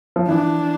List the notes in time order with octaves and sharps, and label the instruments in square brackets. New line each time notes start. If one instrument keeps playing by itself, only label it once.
[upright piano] F3
[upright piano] E3 [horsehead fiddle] D4